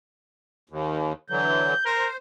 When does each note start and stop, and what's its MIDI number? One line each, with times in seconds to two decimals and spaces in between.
0.70 1.13 39
1.30 1.74 50
1.30 1.74 52
1.30 1.74 54
1.30 1.81 91
1.85 2.08 70
1.85 2.17 72